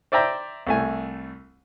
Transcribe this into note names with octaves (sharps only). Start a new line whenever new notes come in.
C5 D5 E5 G5 A#5
C2 A3 G#5